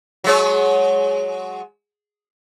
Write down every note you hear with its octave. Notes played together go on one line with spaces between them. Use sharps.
F#3 G#3 C#5